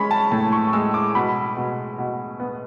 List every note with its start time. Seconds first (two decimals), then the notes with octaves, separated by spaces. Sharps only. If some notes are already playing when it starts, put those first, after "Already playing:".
Already playing: G#3 C#4 B5 C#6
0.11 A5
0.31 A2 A5
0.52 C#6
0.73 G#3 E6
0.94 D6
1.15 B2 B5
1.57 B2
1.98 B2
2.40 B3